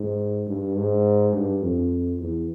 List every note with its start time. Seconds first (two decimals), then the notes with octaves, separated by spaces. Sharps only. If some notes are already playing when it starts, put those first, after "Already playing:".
Already playing: G#2
0.47 G2
0.75 G#2
1.33 G2
1.62 F2
2.19 E2